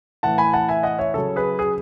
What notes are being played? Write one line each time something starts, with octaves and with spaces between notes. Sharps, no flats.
A2 E3 F#5 A5
G#5 B5
F#5 A5
E5 G#5
D#5 F#5
C#5 E5
C#3 F#3 A4 C#5
G#4 B4
G#4